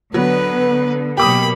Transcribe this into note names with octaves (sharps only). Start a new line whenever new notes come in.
D3 F#3 B3 B4
B2 F#3 A#3 G4 B5 D6 D#6